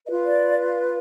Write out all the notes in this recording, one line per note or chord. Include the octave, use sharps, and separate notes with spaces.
F4 B4 D#5
D5